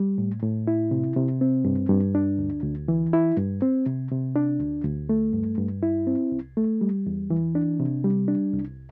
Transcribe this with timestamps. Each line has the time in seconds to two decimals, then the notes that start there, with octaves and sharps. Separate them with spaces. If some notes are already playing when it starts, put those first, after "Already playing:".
Already playing: G3
0.18 A2
0.43 A2
0.67 E4
0.91 C3
1.16 C3
1.41 C4
1.65 G2
1.89 G2
2.15 D4
2.39 D2
2.63 D2
2.88 E3
3.13 E4
3.37 G2
3.62 C4
3.86 C3
4.11 C3
4.36 D4
4.60 D2
4.84 D2
5.09 A3
5.33 G2
5.58 G2
5.83 E4
6.07 C4
6.32 C2
6.57 A3
6.81 G3
7.06 E2
7.30 E3
7.55 D4
7.80 C3
8.04 G3
8.28 D4
8.53 C2